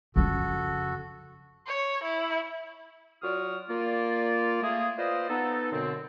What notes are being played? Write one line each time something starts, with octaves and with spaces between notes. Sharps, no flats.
F2 C#3 F#4 A4
C#5
E4
F#3 F4 F#4 D5 D#6 F6
A#3 F4 D5
A3 A#3 G#4
F4 B4 C5 D5 D#5
B3 D#4 A4
F#2 B2 D3 C4